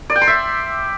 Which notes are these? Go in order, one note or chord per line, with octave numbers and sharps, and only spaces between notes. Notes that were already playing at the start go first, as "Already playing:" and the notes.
D5
G5
C6
E5